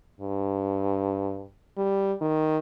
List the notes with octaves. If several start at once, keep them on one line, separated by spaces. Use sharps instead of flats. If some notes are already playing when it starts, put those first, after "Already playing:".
G2
G3
D#3